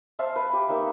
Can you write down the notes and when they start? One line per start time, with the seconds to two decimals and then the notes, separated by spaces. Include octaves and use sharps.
0.19 C5 E5 F5 A5
0.36 B4
0.53 G4
0.69 A#3 D#4 E5